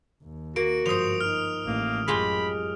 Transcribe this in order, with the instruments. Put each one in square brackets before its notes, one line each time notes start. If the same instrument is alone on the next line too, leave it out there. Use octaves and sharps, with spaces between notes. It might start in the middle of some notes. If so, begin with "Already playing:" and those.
[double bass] D#2
[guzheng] A#3 [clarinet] F#4 [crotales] D7
[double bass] G1 G#2 [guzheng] F3 C5 [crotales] D#6 F7
[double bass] D#4 [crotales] F6
[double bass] A1 [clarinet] A#3
[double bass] F#2 [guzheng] G#3 F4 G4 [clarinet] B5